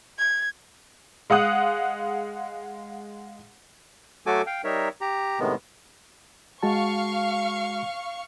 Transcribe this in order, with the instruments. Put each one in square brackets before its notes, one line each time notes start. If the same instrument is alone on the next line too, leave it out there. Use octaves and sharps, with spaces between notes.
[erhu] G#6
[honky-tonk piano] G#3 F5 F#5 D#6 F#6
[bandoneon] F#3 A3 F#4 A4 G#5 D6
F5 G5
G3 D#4 A#4 C#5 E5
G4 A#5
A2 C3 D#3 G#3 B3
[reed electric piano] G#3 F#4 A5 [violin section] F5 C#6